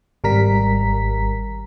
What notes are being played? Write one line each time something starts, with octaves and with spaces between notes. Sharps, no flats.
G#1 G3 A#4 A#5 B6